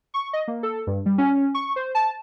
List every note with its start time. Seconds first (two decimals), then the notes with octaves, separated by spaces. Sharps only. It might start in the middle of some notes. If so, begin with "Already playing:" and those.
0.14 C#6
0.33 D#5
0.48 A#3
0.63 A4
0.87 G2
1.06 G3
1.18 C#4
1.55 C#6
1.76 C5
1.95 A5